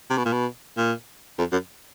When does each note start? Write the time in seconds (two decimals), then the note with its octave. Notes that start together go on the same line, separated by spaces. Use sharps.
0.10 C3
0.18 B2
0.25 A#2
0.33 B2
0.77 A#2
1.39 F2
1.52 F#2